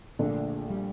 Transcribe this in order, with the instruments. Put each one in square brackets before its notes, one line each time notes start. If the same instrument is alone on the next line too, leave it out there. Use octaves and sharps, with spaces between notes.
[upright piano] A#1 A#2 A3 D4 [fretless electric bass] D3
[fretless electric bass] G3